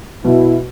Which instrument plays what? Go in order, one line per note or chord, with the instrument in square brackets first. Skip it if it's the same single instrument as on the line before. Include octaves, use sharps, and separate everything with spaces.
[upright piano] B2 [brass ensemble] E4